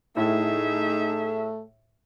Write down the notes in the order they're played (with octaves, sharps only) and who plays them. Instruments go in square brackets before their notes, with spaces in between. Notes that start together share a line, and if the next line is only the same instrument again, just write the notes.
[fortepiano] A2 [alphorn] A3 [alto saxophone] D#4 [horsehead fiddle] G#4 E5